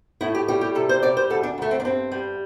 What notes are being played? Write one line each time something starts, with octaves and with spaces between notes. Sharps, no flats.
A2 E4
G4
G3 G4
G4
C3 A4
C5
G3 D5
C5
D2 A4
D4
D2 A3
C4
D4
G2 C4
G3